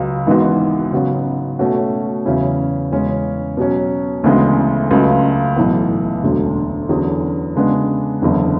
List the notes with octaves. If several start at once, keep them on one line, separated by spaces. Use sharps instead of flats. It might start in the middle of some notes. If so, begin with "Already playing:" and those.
Already playing: C#2 C#3 F#3
G#1 G#2 E3 B3 F#4
C#3 F#3 B3 F#4 C#5
B2 A3 C#4 F#4
E2 C#3 F#3 C#4 E4
E2 C#3 G#3 C#4
B2 F#3 C#4
D2 C#3 E3 G#3 B3
C#2 C#3 F#3 A3
B1 A2 E3 B3
E1 D2 D3 F#3
E2 D3 F#3 C#4 G#4
C#3 G#3 B3 D4
F#1 E2 D3